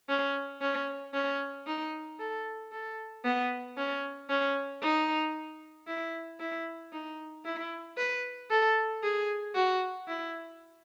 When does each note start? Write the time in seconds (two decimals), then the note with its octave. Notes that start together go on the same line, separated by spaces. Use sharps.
0.08 C#4
0.61 C#4
1.13 C#4
1.66 D#4
2.19 A4
2.72 A4
3.24 B3
3.77 C#4
4.29 C#4
4.82 D#4
5.87 E4
6.40 E4
6.92 D#4
7.45 E4
7.97 B4
8.50 A4
9.03 G#4
9.55 F#4
10.08 E4